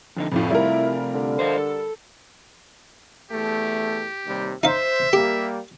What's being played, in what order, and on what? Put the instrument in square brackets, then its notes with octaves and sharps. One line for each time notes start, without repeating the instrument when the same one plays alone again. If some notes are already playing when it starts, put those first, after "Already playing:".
[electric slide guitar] F2 D3 D#4
[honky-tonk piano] F2 A2 [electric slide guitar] C3 A3 F4
[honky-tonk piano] G3 A#4 [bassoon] E4
[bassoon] D3
[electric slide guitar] C5 D#5 F5
A4
[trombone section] E2 A3 [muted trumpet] G4
[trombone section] D#2 C3 G3
[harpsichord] D#4 F5 [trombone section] C5 [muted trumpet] E5
[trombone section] G3 A#3 [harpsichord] G4